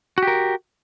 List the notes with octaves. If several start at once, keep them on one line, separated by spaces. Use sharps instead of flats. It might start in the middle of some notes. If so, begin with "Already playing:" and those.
F#4 G4 A#4